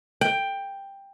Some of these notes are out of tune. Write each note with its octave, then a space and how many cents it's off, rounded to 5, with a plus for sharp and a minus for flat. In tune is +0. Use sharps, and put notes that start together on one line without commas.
G5 +10